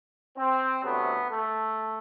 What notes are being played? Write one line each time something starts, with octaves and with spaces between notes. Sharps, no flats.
C4
D2 C3 F#3 A3 B3
A3